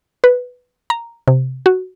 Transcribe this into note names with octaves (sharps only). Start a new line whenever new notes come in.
B4
A#5
C3
F#4